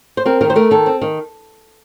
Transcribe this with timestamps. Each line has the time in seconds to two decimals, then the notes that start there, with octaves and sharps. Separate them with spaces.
0.17 C5
0.26 C4 A#4
0.41 D#3 A#4
0.50 C5
0.56 A3 A#4
0.71 D#3 A4
0.86 C4
1.02 D#3